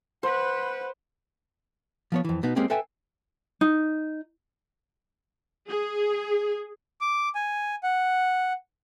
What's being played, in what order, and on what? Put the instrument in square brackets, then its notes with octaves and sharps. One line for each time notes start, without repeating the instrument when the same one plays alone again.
[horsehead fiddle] B4 F#5 [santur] C5
[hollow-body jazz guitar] F3 B3 C#5
F2 E3
B2 B3 D#4
G#3 A#3 C4 C#4 G4
A4 B4 E5 G5 G#5
[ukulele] D#4
[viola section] G#4
[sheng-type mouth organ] D6
G#5
F#5